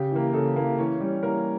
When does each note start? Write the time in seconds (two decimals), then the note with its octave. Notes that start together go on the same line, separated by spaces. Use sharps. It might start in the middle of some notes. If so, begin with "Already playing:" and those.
Already playing: C#3 G4
0.11 E3 A#3
0.33 C#3 A4
0.56 E3 A#3
0.78 E3 C#4 C#5
1.00 G3 C#4
1.23 E3 A#3 A#4